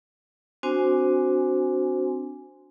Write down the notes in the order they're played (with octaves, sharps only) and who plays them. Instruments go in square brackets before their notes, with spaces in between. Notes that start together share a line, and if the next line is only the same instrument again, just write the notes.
[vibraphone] C4 D4 F#4 C5 G#5